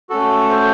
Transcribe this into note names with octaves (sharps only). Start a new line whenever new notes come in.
A3 C#4 F#4 A4
C5